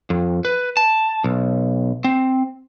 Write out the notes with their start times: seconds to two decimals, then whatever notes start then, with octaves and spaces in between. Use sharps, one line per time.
0.10 F2
0.45 B4
0.77 A5
1.24 B1
2.04 C4